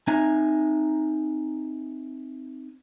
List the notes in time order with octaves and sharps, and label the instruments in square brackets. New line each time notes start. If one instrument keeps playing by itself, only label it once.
[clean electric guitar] C4 D#4 E5 G#5 A#5